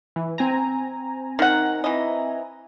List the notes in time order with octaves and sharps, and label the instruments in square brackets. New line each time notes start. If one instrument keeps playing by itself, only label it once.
[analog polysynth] E3
C4 G#5 A#5
[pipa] D#3 F#5
E3 D#5